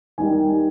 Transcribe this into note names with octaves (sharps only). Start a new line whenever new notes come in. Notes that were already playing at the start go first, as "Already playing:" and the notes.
D#2 D#3 G3 G#5